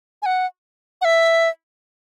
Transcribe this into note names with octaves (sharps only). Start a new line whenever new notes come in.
G#5
F#5
F#5
E5